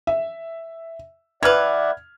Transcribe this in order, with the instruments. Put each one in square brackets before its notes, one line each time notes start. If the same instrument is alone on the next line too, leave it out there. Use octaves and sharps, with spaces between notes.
[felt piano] E5
[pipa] E3 B4 [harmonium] D5 E5 F#5 [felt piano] F6 G#6